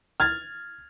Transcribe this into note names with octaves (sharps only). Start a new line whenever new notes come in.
F6 G#6 A6